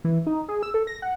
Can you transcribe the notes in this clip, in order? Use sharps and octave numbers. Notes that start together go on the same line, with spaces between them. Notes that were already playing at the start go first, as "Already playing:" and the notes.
E3
D#4
G#4
E6
A4
A#6
F#5